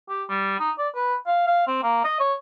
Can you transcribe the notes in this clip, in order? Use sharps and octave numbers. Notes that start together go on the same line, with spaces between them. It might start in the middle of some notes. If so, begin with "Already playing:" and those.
G4
G3
D#4
D5
B4
F5
F5
C4
A#3
D#5
C#5